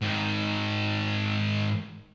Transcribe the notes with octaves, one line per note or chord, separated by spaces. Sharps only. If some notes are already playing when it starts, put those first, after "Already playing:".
G#2 D#3